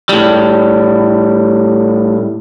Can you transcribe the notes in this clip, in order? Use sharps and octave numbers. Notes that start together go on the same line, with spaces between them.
A2 G3